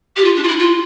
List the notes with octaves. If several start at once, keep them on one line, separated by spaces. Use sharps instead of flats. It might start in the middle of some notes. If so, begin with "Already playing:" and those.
G4
F4
D4
F4
E4
F4